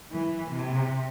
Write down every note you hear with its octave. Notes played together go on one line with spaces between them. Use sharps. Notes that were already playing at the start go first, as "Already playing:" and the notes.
E3
C3